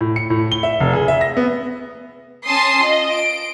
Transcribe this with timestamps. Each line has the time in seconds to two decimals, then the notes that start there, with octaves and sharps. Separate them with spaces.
0.01 A2
0.16 C#7
0.30 A2
0.52 G7
0.63 E5
0.80 F1
0.93 G#4
1.08 E5
1.21 A#6
1.37 B3
2.47 C#4 A5 C6 D#6 C7
2.81 F4 D#5
3.12 D7